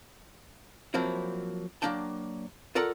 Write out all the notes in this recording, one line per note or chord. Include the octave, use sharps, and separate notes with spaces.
F3 F#3 A#3 C4 E4
F#3 G#3 A#3 D4 G5 A5
F4 A4 A#4 D5 F#5